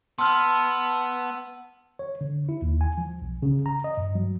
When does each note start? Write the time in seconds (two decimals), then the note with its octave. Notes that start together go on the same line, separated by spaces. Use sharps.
0.19 B3 A5 C6 E6 F6
1.99 C#5
2.21 D3
2.49 E4
2.62 D#2
2.81 G#5
2.98 F3
3.22 B1
3.42 C#3
3.66 A#5
3.84 D#5
3.97 G2
4.15 F#3